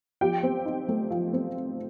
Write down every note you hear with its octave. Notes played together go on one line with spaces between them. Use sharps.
F3 G4 G5
C4
D#4
A3
F3
C4